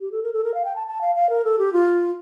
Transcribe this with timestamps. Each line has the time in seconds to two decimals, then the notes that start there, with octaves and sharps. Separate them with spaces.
0.01 G4
0.12 A4
0.23 A#4
0.33 A4
0.44 A#4
0.54 F5
0.65 G5
0.76 A5
0.87 A5
1.01 F5
1.16 F5
1.30 A#4
1.44 A4
1.59 G4
1.73 F4